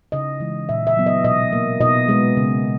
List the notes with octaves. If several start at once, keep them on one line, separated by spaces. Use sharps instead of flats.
C#3 D#5
E3 G#3
A#2 E5
E5
F#3 B3
D#5
B2 D#5
A#3
B2 D#5
G#3 B3
C#3